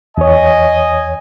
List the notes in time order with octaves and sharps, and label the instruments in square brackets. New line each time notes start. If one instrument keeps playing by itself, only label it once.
[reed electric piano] E2 C#5 [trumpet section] D#5 G#5